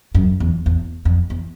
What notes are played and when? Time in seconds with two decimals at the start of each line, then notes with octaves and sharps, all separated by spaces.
0.15 F#2
0.40 E2
0.66 E2
1.05 F2
1.30 E2